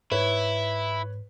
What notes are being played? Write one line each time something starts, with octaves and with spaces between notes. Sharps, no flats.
G#2 E4 B4 C#5